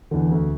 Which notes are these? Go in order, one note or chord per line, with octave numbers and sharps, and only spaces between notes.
E2 D3
D2